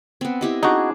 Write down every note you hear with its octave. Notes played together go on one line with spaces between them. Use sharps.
B3 C4
E4 G4 D#5
D4 D#4 F#4 G#4